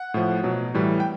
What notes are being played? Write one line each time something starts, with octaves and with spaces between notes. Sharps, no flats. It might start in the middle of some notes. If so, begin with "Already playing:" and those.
Already playing: F#5
A2 F3
B2 F#3
A2 E3 G3
G5